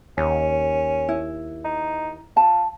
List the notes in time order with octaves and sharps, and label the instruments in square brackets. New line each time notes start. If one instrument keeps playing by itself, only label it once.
[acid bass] D#2 [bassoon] C#4
[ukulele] E4
[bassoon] D#4
[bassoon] F4 [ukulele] A5